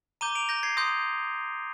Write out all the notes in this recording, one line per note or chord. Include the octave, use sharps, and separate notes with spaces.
A#5 D6 G6 D#7 G7
D7 F7
G6 A#6
G#6 C7
C6 D#6 G6 A#6